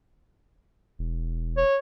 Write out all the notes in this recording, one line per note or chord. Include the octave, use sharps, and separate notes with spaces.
E1
C#5